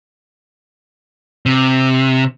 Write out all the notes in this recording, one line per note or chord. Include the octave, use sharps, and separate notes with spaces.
C3